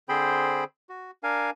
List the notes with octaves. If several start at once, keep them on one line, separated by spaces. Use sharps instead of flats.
D3 C4 G#4 C5 G5 B5
F#4
D4 A#4 F5 G#5